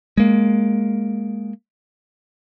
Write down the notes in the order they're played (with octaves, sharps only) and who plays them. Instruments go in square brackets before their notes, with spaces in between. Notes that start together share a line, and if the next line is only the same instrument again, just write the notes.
[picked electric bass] G#3 A#3